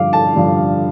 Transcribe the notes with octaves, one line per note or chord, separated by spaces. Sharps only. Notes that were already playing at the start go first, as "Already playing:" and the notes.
Already playing: G2 D3 F3 F5 D6
A5
G2 D3 F3